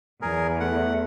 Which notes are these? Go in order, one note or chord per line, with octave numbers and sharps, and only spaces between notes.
E2 G#4 A#4
A3 F#5